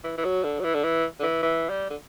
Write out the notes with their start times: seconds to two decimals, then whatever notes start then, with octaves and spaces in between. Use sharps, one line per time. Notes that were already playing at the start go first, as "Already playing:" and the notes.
0.04 E3
0.18 E3
0.24 F#3
0.43 D3
0.60 F#3
0.64 E3
0.74 D3
0.84 E3
1.20 D3
1.23 E3
1.43 E3
1.70 G3
1.90 D3